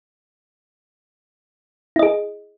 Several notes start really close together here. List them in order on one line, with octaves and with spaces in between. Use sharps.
E4 D#5 G#4